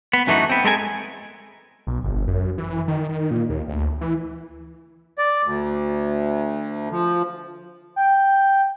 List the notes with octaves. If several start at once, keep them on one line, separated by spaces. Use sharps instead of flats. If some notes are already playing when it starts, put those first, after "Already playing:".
B3
F#2 E3 A3 B3 D#4 F#4
B3 C4
G#3 A4 A#4 G#5
B1
G1
F#2
E3
D#3
D#3
A#2
D#2
D2
E3
D5
D2
F3
G5